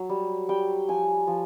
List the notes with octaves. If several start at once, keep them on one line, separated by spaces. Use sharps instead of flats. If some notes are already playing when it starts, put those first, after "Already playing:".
Already playing: F#3
G3
G3 G5
F3 G#5
F3